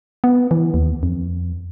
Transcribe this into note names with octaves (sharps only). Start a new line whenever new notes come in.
B3
E3
D#2
F2